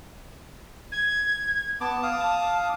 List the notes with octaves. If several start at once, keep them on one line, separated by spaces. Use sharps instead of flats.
G#6
B3 A5 D6
F5 D6 D#6